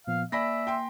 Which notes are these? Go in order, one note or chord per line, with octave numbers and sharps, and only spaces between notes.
A#2 F3 B3 F5
A#3 D5 E5 G#5 B5 A#6 B6
G5 C6